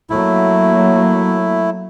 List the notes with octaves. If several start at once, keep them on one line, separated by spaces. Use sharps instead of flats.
F#3 A3 A#3 E4